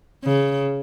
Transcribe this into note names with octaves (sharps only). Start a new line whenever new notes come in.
C#3